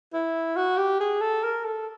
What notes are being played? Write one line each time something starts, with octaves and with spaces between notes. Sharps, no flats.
E4
F#4
G4
G#4
A4
A#4
A4